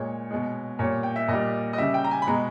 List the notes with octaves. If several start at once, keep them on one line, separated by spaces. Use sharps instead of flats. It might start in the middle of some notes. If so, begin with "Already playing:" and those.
Already playing: A#2 G#3 C#5
B2 G#3
A#2 G3 C#5
G5
E5
A#2 G3 D#5
D#5
C#3 G3 E5
G5
A#5
G#5
B5
B2 G#3 A#5